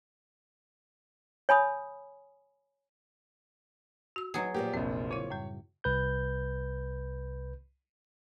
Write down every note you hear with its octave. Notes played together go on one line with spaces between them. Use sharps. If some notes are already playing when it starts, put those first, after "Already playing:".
C#5 G#5 B5 D#6
F#4 E6
F#3 B3 D4 D#4 G#4
A#2 F3 A#3 G4
F1 A#1 C4
C#3 E4 C#5
F#2 A2 G3
C2 B4 G6